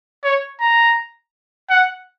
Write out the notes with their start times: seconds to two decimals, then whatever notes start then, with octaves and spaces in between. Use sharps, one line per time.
0.24 C#5
0.60 A#5
1.70 F#5